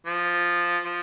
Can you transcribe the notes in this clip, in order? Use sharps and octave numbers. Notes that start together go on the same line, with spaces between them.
F3
F3